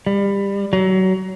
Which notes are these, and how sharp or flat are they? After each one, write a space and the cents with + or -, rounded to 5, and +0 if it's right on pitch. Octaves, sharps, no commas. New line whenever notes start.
G3 +25
F#3 +25